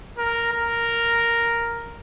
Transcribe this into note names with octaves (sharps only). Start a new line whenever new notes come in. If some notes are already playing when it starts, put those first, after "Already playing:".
A#4
A#4